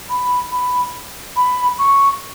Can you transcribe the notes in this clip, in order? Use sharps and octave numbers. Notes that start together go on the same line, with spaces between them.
B5
B5
B5
C#6